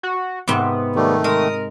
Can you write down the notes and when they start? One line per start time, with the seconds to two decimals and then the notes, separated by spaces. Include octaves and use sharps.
0.03 F#4
0.48 G#2 C3 B3 C4
0.95 D#3 G3 A3
1.24 G#3 A#4 D#6